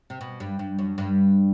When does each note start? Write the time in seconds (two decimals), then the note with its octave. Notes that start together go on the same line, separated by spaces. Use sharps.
0.10 C3
0.21 B2
0.40 G2
0.59 G2
0.79 F#2
0.98 G2